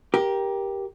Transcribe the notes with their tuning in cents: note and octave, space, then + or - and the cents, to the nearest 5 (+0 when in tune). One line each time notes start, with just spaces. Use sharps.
G4 +0 A#4 +20